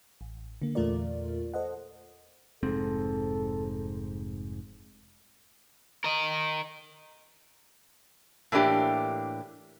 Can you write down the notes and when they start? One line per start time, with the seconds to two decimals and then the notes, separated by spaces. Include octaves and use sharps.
0.21 A1
0.62 D3 A#3
0.75 E2 A#2 A3 F4 A#4 D5
1.54 A4 C5 D#5 F#5
2.63 F1 G#2 C4 A4
6.04 A#4 D#5
8.52 A2 E3 A#3 D4 G4